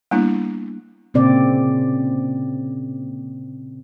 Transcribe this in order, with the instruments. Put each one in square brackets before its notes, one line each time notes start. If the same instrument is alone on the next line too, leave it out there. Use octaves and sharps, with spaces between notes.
[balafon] G3 A#3 B3 D4 E4
[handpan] A#2 C#3 C4 D5